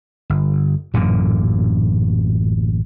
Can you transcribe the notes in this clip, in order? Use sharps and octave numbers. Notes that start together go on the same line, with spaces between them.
G1
A1 F#2 A#2 D3